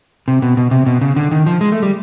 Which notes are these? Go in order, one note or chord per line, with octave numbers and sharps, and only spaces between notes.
C3
B2
B2
C3
B2
C#3
D3
D#3
F3
G#3
A3
G3